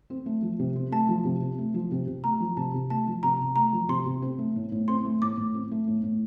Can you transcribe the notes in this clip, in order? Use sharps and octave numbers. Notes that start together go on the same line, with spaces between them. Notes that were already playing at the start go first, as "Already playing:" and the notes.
C4
A3
F3
C3
C4
A3 A5
F3
C3
C4
A3
F3
C3
C3
A3 A#5
F3
C3 A5
C3
A3 A5
F3
C3 A#5
C3
A3 A#5
F3
C3 C6
C3
C4
A3
A2
A2
C4 C6
A3
A2 D6
A2
C4
A3
A2
A2